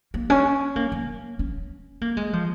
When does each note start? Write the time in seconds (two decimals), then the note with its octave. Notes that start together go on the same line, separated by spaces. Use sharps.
0.14 A#3
0.30 C#4
0.76 A#3
0.92 A#3
1.39 C#4
2.01 A#3
2.17 G#3
2.33 F3